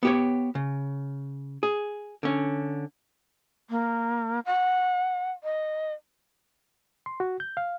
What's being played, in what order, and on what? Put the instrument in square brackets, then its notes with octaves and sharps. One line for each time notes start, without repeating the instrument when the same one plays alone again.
[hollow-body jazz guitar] B3 G4 C#5
C#3
G#4
D3 C#4
[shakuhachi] A#3
F#5
D#5
[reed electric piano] C6
F#4
G6
F5